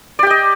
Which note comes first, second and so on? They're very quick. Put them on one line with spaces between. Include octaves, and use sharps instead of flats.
D5 G4 G5 D#5